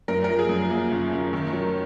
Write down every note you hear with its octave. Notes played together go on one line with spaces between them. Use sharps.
F#2 A#4
A#4
F3
G#4
F#2
A#3
F#1
F#1
D#3
F#3